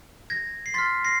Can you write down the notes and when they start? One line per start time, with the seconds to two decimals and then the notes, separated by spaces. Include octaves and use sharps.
0.30 G#6 A#6
0.66 C7
0.74 C6 F6 A6 B6
1.05 A#6 C7